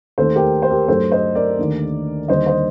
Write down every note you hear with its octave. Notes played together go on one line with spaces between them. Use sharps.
D#2 D#3 A3 A4 C5
G4 A#4
C5
G4 A#4
G2 F#3 A3 A4 C5
C5 D#5
A#4 D5
D#2 D3 A3
D#2 D3 G3 A#3 C5 D#5
C5 D#5